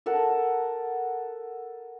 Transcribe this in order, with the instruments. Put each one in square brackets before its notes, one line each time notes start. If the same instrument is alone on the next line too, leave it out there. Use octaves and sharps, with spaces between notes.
[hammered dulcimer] A4 A#4 F#5